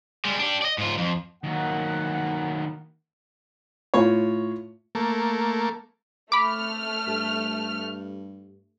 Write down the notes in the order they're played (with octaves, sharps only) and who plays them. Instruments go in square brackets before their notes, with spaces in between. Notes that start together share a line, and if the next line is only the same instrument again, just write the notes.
[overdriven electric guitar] G3 G#3
D4 G4
D5 D#5
G#2 F4
F2
[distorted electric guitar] D#3 F#3 [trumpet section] A#3 F#5
[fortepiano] A2 F4 C#5
[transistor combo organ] A3 A#3
[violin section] A3 F6 [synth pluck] B5 D6
[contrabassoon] G2